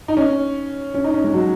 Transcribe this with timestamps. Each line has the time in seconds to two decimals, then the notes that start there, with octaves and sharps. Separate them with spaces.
0.08 D#4
0.17 C#4
0.94 C#4
1.04 D#4
1.14 C#4
1.24 G#3
1.34 F#3